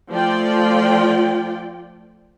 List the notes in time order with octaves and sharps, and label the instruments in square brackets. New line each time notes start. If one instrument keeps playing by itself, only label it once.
[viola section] F3 A3 F4 D5 G5